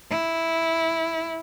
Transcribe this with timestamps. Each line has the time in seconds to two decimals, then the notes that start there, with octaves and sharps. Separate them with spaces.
0.11 E4